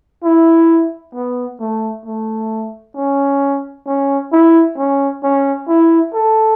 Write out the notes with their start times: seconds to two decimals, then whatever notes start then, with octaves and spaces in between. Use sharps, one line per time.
0.24 E4
1.15 B3
1.60 A3
2.06 A3
2.96 C#4
3.87 C#4
4.32 E4
4.77 C#4
5.23 C#4
5.68 E4
6.14 A4